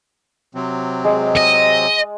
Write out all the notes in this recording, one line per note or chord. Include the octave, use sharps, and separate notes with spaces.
C3 F#3 C4
G#3 D5
D#5